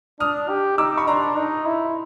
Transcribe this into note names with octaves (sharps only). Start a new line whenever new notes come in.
D4 D#6 F6
G4
D#4 D6 E6
B5 C#6
D4 A#5 C6
D#4
E4